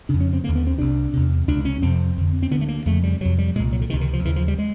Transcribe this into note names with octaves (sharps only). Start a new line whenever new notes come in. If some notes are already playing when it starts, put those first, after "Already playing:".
F2 C#3 D4
C#4
C4
D#2 D3 A#3
B3
C4
C2 C3 D4
E2 C3
C#2 C3 D4
C#4
F2 C3 C4
F2 D3
C4
D2 D3 B3
A3
A#3
F2 C#3 A3
G3
F2 C3 F#3
G3
C2 A#2 G#3
F#3
D3
C#2 C3 D#3
D#3
F3
D#2 C#3 E3
F3
G3
G#3